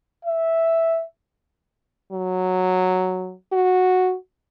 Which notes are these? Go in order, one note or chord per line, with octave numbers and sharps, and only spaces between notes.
E5
F#3
F#4